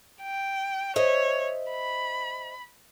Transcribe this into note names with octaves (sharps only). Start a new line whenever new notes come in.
G5
C5 C#5 D#5 E5
B5